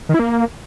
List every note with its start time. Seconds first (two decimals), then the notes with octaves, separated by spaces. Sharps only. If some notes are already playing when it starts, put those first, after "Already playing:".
0.09 D#3
0.14 E4
0.19 A#3